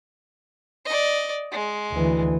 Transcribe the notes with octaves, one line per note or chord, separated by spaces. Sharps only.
D5 D#5
G#3
D2 E3